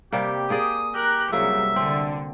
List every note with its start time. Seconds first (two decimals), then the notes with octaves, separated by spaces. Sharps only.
0.13 C3 G3 A#3 G4
0.50 A#3 G#4 D5 D#6
0.94 G4 A#4 F#6
1.32 C2 C#3 F#3 A#3 F#4 E5
1.76 D3 C4